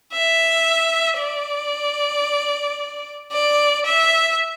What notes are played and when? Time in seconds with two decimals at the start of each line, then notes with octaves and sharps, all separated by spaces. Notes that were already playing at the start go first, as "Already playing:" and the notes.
0.13 E5
1.19 D5
3.32 D5
3.86 E5